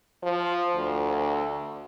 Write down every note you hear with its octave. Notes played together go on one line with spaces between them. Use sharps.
F3
D2